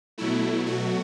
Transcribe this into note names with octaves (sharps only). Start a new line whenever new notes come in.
B2 F#3 A3 E4
F#4